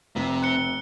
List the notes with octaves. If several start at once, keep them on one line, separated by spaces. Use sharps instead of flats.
F1 C3
F#6 C#7 G7